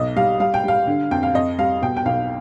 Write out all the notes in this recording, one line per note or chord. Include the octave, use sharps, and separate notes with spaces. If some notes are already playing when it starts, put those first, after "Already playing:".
Already playing: B1 D#5
G3 F5
G3 F5
G5
G3 F5
D3
F2 G5
F5
F2 D#5
G3 F5
B2 G5
G5
B1 F5